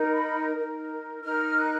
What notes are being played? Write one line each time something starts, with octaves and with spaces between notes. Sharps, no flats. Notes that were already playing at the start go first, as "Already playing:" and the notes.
Already playing: D#4 A#4
B5
D#4 A#4
D#4 A#4 F6
F#6